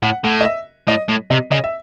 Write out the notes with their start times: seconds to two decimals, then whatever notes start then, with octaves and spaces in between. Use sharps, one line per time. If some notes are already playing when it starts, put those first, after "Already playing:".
0.02 A2 F#5
0.24 A2 F#5
0.41 D#5
0.45 E5
0.88 A2 D#5
1.09 A2
1.30 C3 D#5
1.51 C#3 D#5
1.64 E5